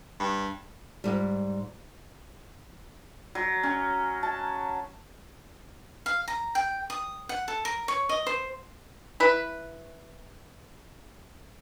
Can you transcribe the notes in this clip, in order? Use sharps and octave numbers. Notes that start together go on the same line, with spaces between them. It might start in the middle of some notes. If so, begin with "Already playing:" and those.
G2
G#2 G3
F#3
C#4
A5
F5
A#5
G5
D#6
F#5
A4
A#4
C#5
D#5
C5
E4 B4